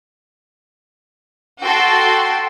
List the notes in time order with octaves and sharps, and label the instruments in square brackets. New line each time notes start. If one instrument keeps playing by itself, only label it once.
[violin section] F#4 A4 G5 C6